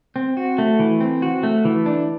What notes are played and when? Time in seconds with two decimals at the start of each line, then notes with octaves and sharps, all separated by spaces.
0.16 C4
0.37 F#4
0.58 A3
0.79 E3
1.01 C4
1.22 F#4
1.43 A3
1.65 E3
1.86 D4